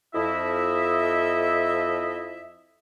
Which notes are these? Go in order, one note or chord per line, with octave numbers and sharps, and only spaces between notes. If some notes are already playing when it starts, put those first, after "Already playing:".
F2 E4 D#5 E5